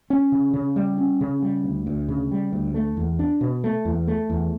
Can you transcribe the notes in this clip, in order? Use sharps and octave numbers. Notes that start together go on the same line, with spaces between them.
C#4
C#3
C#3
G3
C#4
C#3
G3
D2
D2
C#3
G3
D2
A3
E2
D4
B2
A3
E2
A3
E2